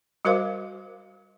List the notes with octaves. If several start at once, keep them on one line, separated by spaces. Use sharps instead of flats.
G3 F#4 A#4 C5 F5